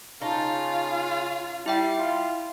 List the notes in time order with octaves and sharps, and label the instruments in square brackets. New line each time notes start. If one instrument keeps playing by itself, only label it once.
[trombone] C#3 [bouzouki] D#4 A5 [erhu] F4
[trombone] G3 [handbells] E4 E5 G5
[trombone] F4